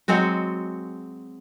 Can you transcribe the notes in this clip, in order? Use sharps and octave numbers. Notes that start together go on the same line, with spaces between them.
F#3 G#3 C4 F#4